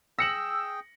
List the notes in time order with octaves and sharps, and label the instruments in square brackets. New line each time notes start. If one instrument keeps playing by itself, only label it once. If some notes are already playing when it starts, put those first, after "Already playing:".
[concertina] G#4 G5 [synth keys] E6 [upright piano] A#6 C#7 F#7